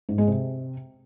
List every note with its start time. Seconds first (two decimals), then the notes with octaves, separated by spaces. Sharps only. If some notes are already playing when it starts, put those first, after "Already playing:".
0.09 G#2
0.18 G#3
0.28 C3